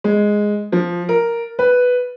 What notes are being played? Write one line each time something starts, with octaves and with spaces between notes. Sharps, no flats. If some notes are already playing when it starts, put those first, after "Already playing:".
G#3
F3
A#4
B4